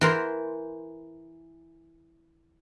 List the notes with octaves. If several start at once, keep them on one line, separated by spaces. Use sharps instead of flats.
E3 A#4 C5